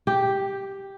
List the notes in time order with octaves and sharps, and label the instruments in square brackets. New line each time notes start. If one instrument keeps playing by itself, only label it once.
[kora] G4